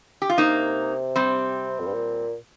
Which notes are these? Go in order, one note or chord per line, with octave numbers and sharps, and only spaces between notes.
G4
F4
C3 A#3 D#4
G3 C4
F2
G2
A#2